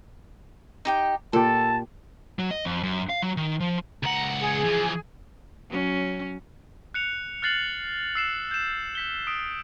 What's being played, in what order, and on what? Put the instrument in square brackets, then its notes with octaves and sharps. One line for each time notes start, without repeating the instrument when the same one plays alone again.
[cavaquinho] D#4 G4 G5
[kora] A#2 G4 [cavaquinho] A4 [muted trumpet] A5
[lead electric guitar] F#3
D#5
F2
F#2
F5
F#3
D#3
F3
[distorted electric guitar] C#2 F#5 [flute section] A#5
[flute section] G#4
[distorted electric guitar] E3 F3
[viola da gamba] F#3 C#4
[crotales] F#6 C#7 F7
F6 F#6 A6 C7 F#7
E6 C7 E7
G6 E7
G6 B6 G7
D#6 B6 D7